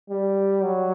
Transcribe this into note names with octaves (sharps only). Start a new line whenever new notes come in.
G3
F#3